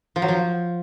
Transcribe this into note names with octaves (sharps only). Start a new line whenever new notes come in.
F3
F#3
F3